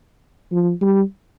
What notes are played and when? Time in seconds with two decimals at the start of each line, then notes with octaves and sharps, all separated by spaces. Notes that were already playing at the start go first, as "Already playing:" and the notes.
0.52 F3
0.81 G3